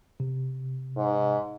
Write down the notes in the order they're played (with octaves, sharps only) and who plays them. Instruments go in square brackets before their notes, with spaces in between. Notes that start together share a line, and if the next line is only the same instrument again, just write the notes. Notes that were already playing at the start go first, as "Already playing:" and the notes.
[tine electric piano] C3
[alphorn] G#2